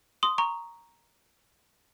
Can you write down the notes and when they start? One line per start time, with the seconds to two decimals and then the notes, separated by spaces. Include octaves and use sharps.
0.23 C6 D#6
0.38 A#5 C#6